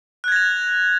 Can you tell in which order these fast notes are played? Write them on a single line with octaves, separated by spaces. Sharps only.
F#6 G#6 A#6 F7